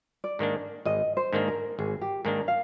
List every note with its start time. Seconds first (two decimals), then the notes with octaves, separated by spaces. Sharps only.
0.24 D5
0.39 G#2 D#3 A#3 D4
0.85 G#1 D#5
1.17 C5
1.33 G#2 D#3 A#3 D4
1.48 A#4
1.79 G#1 G#4
2.01 G4
2.25 G#2 D#3 A#3 D4 A#4
2.48 F5